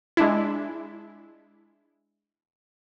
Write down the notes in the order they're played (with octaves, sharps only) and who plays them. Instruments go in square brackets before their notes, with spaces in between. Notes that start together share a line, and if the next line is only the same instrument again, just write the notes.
[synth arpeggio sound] G#3 D4 E4